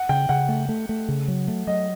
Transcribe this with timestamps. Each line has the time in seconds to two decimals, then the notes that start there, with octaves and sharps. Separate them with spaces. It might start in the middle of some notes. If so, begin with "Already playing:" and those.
Already playing: F#5
0.09 C#3 G5
0.29 C#3 F#5
0.48 A3
0.69 A3
0.89 A3
1.08 C#3
1.28 F#3
1.48 A3
1.67 F#3 D#5